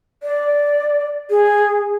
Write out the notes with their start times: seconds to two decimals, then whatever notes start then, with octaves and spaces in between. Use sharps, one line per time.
0.23 D5
1.30 G#4